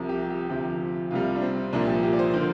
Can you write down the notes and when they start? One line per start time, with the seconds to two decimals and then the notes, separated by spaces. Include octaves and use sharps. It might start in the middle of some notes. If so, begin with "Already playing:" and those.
Already playing: C2 C3 F3
0.09 G4
0.30 G4
0.49 D2 C3 F3 G4
1.11 C2 C3 G3 F4
1.36 D4
1.42 C4
1.73 C2 A#2 F3 D4
1.87 G4
2.03 G4
2.13 D5
2.19 C5
2.33 D3 F3 A#4